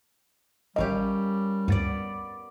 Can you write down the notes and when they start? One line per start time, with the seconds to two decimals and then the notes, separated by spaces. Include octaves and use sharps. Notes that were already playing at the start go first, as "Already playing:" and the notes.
0.76 A1 G3 A#3 C#4 G4 D#5
1.68 D2 G2 B3 D5 A6